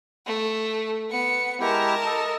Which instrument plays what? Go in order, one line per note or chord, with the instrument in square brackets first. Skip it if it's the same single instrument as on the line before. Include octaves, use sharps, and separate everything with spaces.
[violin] A3
B3 C#7
[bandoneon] G#3 E4 G4 [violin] A#4 A5
[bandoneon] A4 D#5